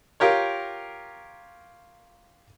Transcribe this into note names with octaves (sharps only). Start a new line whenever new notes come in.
F4 G4 A#4 C#5